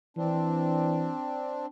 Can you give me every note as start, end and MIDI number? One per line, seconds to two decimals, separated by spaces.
0.17 1.12 52
0.17 1.66 60
0.17 1.66 62